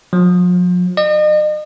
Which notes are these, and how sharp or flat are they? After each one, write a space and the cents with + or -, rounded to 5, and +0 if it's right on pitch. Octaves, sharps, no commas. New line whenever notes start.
F3 +45
D#5 -40